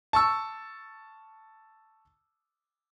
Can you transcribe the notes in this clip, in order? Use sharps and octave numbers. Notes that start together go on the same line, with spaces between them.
A5 C#6 E6